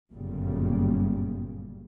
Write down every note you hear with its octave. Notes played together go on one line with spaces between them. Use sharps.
G1 F#2 A#2 C#3 G3